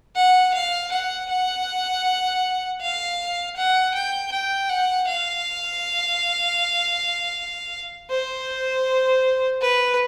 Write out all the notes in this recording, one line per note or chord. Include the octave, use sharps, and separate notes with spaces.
F#5
F5
F#5
F#5
F5
F#5
G5
G5
F#5
F5
C5
B4